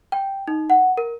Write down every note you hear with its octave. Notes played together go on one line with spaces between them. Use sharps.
G5
D#4
F#5
A#4